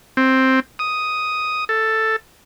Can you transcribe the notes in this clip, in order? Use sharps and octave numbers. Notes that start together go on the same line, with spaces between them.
C4
D#6
A4